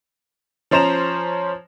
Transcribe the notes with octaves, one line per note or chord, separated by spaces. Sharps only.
F3 C#4 C5 A#5 E7 F7